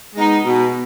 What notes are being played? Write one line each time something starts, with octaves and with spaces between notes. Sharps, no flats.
G#3 B3 D#4
B2